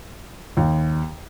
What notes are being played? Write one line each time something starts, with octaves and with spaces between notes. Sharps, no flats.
D#2